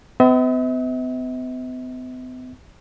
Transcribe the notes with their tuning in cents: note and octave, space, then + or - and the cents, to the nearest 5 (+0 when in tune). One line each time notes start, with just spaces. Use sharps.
B3 +45 E5 -45